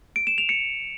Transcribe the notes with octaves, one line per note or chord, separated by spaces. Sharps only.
D7
E7
F7
C#7